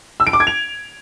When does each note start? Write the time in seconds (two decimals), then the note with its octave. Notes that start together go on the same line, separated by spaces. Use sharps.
0.20 E6
0.27 D7
0.33 D6
0.40 G#6
0.47 F7